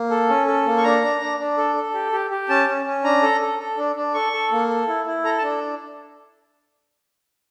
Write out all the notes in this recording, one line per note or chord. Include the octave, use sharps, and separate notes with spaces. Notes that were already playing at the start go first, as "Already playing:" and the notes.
Already playing: A#3
A4
C#4
A4
A#3
C#6
D4 A#5
D4
D4
D4
A4
A4
G4
G4
G4
C#4 A5
C#4
C#4
D4 A#5
A4
A4
A4
D4
D4
A4 C#6
A4
A#3
A4
E4
E4
A4 A#5
A5
D4